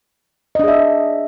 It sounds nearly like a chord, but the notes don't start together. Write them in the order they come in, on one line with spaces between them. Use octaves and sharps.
D#5 D4 G#4 E5